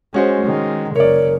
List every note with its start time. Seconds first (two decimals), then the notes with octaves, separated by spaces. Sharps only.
0.14 G#3 C#4 F#4 C5
0.45 D#3 G#3
0.96 F#1 C#3 A#4 C#5 D5